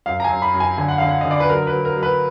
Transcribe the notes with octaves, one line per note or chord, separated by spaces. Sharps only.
F#2 F5
A#5
G#5
F#2
B5
F#2
G#5
D3 G#5
F#5
D3 F5
F#5
D3 D#5
D5
B4
F#3 A#4
B4
F#3
A#4
F#3
B4